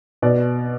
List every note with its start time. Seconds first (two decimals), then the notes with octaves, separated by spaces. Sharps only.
0.22 B2 D5